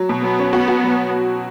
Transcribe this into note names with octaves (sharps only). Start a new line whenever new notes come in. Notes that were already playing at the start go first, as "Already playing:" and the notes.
Already playing: F#3
B2
F#3 B3
C#4
B3 F#4
F#4
F#3